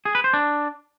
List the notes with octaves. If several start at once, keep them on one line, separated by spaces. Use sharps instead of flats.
G#4
B4
C5
D4